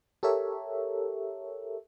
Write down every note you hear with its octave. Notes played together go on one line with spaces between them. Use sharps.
G4 A4 A#4 C#5 E5